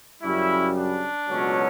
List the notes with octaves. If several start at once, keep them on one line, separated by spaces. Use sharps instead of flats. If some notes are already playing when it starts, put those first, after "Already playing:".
F#2 C#3 G3 C#4 E4
D4
C#2 B2 F#3 A3 C#4